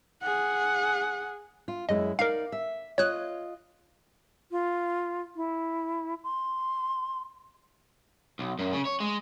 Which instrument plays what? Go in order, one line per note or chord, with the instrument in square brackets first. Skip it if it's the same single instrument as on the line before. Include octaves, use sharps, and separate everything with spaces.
[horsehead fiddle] G#4 F#5
[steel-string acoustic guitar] F4
[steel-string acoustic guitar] F#2 G#3 E4 [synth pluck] D#5
[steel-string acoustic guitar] D#4 D5 [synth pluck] A#4 F5
[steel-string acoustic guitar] E5
[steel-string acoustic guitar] F4 D#5 [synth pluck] C#5 F#6
[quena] F4
E4
C6
[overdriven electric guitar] B1
F#2
C#3
C#5
G#3